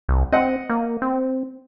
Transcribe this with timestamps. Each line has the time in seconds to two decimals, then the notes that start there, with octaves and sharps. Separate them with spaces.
0.09 C2
0.32 C4 D#5 F#5
0.69 A#3
1.02 C4